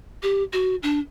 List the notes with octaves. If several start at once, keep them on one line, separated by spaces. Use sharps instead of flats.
G4
F#4
D4